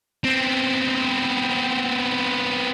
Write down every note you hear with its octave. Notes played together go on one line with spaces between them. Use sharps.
B3 C4